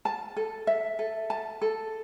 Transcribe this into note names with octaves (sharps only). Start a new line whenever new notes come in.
A5
A4
E5
A4
A5
A4